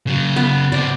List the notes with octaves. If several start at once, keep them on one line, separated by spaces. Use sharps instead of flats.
C#3 F#3
B3
C3 F#4 D5